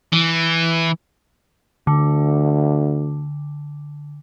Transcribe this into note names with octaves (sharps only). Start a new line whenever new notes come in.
E3
D2 D3